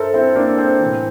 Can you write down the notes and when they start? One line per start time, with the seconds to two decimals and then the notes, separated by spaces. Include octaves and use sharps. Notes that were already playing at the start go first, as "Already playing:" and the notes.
Already playing: G2 A4 A#4 C5 E5
0.14 C4 E4
0.36 A#3 D4
0.58 C4
0.80 E3
0.85 A2